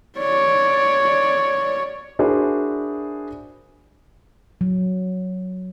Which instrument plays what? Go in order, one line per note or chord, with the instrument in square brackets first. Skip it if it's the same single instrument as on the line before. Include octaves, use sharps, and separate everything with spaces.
[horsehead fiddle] C#5 D5
[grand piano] D4 E4 F#4 G#4 A#4 C5
[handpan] F#3